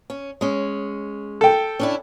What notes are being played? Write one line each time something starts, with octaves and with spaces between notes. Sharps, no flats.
C#4
G#3 C#4
A4 G5
C#4 D4 E4